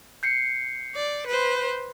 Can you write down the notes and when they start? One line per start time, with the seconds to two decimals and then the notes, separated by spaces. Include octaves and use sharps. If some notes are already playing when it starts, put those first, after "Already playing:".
0.23 G6 C7 C#7
0.95 D5
1.27 B4 C5